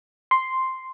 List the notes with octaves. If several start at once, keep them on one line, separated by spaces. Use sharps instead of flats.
C6